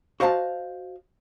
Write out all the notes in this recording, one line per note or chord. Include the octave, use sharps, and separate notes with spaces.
F#4 C5 D#5 F5 A5